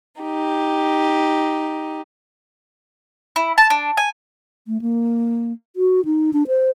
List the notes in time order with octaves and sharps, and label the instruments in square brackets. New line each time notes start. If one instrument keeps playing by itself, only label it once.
[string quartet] D#4 G4
[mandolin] E4
A5
D4
G#5
[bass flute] A3
A#3
F#4
D#4
D4
C5